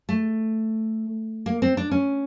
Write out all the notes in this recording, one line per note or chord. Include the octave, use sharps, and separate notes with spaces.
A3
A#3
C4
D4
C#4